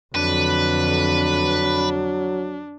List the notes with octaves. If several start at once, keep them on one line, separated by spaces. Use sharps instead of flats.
F2 D3 F#3 D4 B4